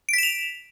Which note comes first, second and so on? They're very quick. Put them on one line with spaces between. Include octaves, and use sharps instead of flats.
D7 B6 E7 F7